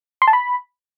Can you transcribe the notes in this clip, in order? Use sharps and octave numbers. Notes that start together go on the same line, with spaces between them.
C6
A5
B5